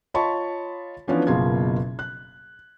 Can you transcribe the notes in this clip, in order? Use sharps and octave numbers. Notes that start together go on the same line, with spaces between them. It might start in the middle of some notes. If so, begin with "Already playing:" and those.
F4 C#5 D#5 A5 B5 C#6
E3 F3 B3 C#4 D4
F#1 B2 A#3 F4 G#4 G#6
F#6